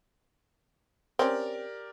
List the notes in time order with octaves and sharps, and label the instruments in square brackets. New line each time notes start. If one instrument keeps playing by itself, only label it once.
[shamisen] C4 C#4 [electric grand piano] G4 A#4 D5